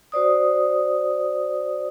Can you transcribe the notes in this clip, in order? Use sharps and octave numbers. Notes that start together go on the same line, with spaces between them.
F#4 C5 D5 D#6